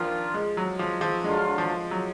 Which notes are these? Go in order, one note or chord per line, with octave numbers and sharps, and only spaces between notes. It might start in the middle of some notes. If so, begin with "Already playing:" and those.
Already playing: D#3 F3 A#3 D4 F4
G#3
F#3
F3
F3
D3 F#3 G#3 D4 F4
F3
F#3